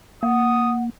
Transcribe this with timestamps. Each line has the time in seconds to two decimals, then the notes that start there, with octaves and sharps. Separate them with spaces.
0.23 A#3 F#5 D#6